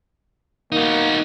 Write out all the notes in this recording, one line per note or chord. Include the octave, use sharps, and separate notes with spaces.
A#3 D#4 F#4